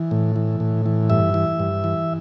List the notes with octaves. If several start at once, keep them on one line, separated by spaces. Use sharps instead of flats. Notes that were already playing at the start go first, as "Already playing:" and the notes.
Already playing: E3
A2
E3
A2
E3
G2 E5
E3
G2
E3